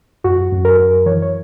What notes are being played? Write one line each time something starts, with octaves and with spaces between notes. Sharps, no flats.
F#2 F#4
F#2
A#4
F#2
E3 C#5
C#5